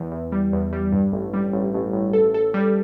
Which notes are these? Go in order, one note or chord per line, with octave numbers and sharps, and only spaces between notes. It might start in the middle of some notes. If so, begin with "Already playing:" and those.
Already playing: E2 E3
E2
G3
E2
G3
G2
A1
G3
A1
A1
A1
A4
A4
G3